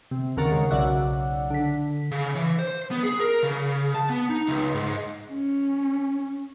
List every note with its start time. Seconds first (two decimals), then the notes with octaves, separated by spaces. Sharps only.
0.11 C3
0.37 D#2 C#3 A#4 F#5 C#6 A6
0.51 G#3 C#4
0.71 B1 C#3 F#3 D5 E5 F#5
1.50 D3 B6
2.11 C#3
2.35 E3
2.59 C5
2.91 B3
3.03 G#4
3.20 A#4
3.43 C#3
3.94 A5
4.10 B3
4.30 D#4
4.47 C#2
4.74 G#2
5.29 C#4